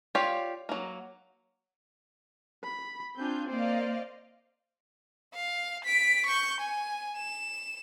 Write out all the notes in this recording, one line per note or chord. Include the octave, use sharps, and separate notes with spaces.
F4 G4 C#5 D5 F5
F#3 A#3
B5
C4 D4 F4 G#5 G6
A#3 C5 D5 D#5 F5
F5
B6 D7
C#6 G6
G#5
E7